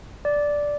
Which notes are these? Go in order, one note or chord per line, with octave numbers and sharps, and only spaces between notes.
D5